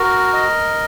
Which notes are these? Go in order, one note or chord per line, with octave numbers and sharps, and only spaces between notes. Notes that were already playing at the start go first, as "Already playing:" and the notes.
Already playing: F#4 A#4
D#5